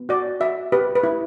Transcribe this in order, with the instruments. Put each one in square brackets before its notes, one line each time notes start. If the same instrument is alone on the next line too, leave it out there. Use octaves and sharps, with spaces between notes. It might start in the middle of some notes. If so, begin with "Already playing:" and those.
Already playing: [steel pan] B3
F#4 D5
F#4 E5
G4 B4
B4
E4